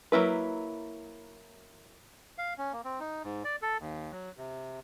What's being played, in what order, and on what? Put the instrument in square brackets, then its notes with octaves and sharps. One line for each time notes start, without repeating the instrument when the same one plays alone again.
[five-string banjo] F#3 A#3 E4 B4
[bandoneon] F5
C#4
A#3
C4
D#4
G#2
D5
A4
D#2
F#3
C3